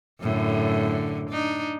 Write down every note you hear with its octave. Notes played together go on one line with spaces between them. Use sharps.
F#2 A2 D3
D4 D#4